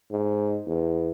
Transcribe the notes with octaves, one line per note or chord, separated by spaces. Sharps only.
G#2
E2